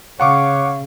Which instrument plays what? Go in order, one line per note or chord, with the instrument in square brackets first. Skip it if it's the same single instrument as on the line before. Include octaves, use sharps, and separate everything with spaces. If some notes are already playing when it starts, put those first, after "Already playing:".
[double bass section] C#3 [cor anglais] C#5 [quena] F5 [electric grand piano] F#5 C#6 D6